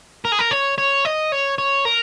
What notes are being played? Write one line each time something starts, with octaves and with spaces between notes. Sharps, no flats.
A#4
G#4
A#4
C#5
C#5
D#5
C#5
C#5
A#4